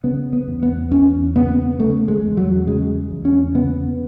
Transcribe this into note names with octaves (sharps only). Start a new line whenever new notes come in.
C#3 B3
B3
E2
B3
E2 C#4
C#3 B3
C#3 A3
G#3
E2
F#3
C#3 G#3
E2
C#4
C#3 B3